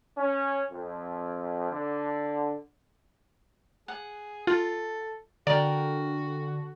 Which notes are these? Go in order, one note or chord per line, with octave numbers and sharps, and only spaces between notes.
C#4
F2
D3
G#4 F#5
F4 A4
D3 F#4 A#4 D5 G5